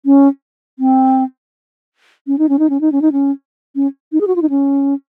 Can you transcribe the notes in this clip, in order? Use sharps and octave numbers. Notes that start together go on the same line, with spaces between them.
C#4
C4
C#4
D#4
C#4
D#4
C#4
D#4
C#4
D#4
C#4
C#4
D#4
G#4
F#4
F4
D#4
C#4